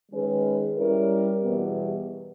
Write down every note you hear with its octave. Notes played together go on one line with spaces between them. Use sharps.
D#3 G#3 C#4 G#4 B4
G3 C#4 E4 A#4
E2 B2 G3 B3